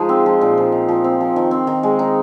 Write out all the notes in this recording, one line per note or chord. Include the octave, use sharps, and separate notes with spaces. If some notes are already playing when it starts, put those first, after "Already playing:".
Already playing: F3 G#3 D#4 G#4
C4
F3
A#2
F3
D#4
F3
C4
F3
D#3
C4
D#3
G#3
D#4